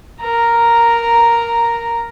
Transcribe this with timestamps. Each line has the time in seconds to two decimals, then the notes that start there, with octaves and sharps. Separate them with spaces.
0.21 A#4 A#5